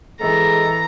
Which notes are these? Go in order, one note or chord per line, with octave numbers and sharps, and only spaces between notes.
E3 G#3 A4 A#5